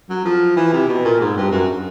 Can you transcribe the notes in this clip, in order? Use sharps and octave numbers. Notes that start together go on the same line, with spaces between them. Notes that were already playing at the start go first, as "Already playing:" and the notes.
F#3
F3
E3
C3
B2
A#2
G#2
G2
F#2